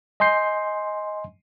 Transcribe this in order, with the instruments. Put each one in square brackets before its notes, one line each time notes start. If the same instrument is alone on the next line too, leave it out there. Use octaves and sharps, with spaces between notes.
[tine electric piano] D#5 G#5 C6 G6 C7